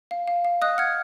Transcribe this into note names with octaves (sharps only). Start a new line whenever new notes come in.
F5
F5
F5
D#5 D#6 F#6
F#5 F6 G#6